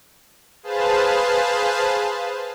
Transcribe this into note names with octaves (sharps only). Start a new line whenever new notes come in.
G#4 B4 C5 F5 A5